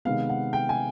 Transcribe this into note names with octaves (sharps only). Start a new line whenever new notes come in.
C3 D#3 G#3 B3 F5
F#5
G5
G#5